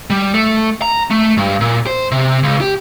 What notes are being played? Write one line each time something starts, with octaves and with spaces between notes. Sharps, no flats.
G3
A3
A#5
A3
G2
A#2
C5
C3
C#2
G4